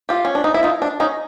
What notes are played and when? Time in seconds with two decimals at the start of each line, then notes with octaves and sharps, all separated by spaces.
0.09 F4 G4
0.25 C#4
0.35 D4
0.44 D#4
0.54 E4
0.63 D#4 F4
0.82 D4
1.00 C#4 D#4